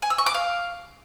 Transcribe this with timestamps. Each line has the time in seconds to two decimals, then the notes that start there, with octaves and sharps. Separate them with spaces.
0.02 G#5
0.10 E6
0.18 C#6
0.26 D6
0.34 F5